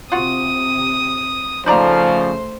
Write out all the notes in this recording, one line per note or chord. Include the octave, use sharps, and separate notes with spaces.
C3 F4 F#4 D#6
C#3 F3 A3 D#4 C5 D5 A#5